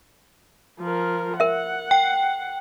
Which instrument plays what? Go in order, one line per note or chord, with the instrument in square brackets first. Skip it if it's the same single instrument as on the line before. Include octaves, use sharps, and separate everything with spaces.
[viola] F3 A#4
[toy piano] A#4 E5 [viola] F#5
[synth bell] G5